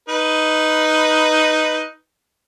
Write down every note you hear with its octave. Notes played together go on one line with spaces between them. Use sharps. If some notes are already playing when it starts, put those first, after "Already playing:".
D#4 B4